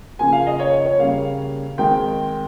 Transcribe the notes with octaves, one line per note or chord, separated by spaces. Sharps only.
C#3 F3 A#3 G#5
F5
D#5
C#5
C#5
C#3 G3 A#3 F5
D#3 G#3 C4 G5